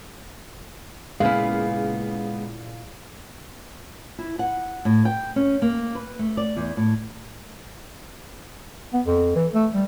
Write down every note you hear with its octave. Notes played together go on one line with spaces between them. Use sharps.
A#2 C#3 G#3 A#3 B3 E4 G#4 F5
E4
F#5
A2
G5
C#4
A#3
B4
A3
D5
E2
A2
B3
F2
E3
A3
G3